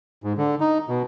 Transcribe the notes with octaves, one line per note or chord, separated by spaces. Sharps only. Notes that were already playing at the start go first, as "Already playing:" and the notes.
G#2
D3
D#4
B2